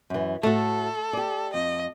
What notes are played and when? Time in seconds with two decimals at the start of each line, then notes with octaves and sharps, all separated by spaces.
0.10 F#2 E3
0.43 A2 A3 F#4 A4
1.13 G4 D5
1.54 F2 D#5